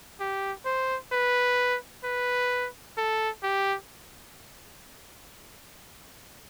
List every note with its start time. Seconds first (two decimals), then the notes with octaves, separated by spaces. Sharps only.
0.20 G4
0.65 C5
1.12 B4
2.04 B4
2.97 A4
3.43 G4